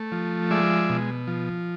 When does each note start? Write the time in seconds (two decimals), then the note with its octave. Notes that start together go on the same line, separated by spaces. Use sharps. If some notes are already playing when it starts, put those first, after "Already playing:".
Already playing: A3
0.12 F3
0.51 G#3 D5 E5
0.90 B2
1.28 F3